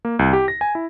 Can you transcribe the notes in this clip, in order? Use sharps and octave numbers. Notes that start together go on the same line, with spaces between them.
A#3
C2
G4
A#6
G#5
E4